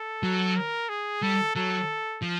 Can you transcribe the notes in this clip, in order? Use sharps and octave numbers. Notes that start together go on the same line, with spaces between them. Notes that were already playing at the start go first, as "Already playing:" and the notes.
Already playing: A4
F#3
A#4
G#4
G3 A4
F#3 A4
F3